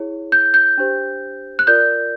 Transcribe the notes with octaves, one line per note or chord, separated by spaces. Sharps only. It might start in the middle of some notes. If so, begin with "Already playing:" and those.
Already playing: E4 G#4 C#5
G6
G6
D4 G4 C5
F#6
F4 A#4 D5 G6